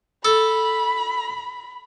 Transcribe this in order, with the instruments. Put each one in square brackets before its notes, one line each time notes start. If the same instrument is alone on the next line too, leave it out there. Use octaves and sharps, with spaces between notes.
[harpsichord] A4 [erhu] B5